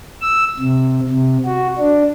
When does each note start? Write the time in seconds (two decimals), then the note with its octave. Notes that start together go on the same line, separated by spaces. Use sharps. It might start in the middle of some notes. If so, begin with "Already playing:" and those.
0.21 E6
0.60 C3
1.10 C3
1.46 F#4
1.78 D4